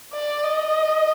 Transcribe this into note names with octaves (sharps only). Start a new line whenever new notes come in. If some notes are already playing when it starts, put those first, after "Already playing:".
D5
D#5